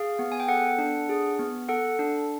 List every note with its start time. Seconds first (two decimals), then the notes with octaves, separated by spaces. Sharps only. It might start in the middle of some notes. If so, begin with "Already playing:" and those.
Already playing: G#4 F5
0.19 B3
0.32 G#5
0.40 G5
0.48 A4 F#5
0.78 D4
1.09 G#4
1.39 B3
1.69 A4 F#5
1.99 D4